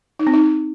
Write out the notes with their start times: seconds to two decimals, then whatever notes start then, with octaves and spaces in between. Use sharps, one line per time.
0.19 D#4
0.27 C4
0.34 D#4